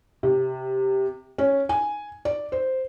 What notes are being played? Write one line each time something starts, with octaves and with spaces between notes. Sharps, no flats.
C3
C#4
G#5
D5
C5